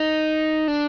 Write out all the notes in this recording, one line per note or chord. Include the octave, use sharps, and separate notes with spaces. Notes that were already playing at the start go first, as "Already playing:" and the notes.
Already playing: D#4
D4